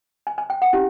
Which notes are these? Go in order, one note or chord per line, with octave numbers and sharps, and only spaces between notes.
G#5
G#5
G5
F#5
C#4 E4 G4